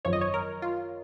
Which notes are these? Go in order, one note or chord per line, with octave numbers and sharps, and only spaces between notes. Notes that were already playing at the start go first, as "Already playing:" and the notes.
G#1 F#2 F3 C#5
D#5
C#5
A#4
F4